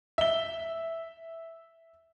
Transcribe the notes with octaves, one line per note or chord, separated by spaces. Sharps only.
E5 G7